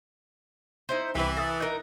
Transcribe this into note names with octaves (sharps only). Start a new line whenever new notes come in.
D#4 E4 C5
C2 E3 G4 B4
A4 E5 D#6 A6
D#4 A#4 F#6